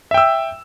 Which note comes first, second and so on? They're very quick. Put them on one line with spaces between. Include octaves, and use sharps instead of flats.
E5 G5 E6